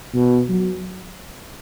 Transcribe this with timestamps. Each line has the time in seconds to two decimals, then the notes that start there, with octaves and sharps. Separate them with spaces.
0.14 B2
0.49 F#3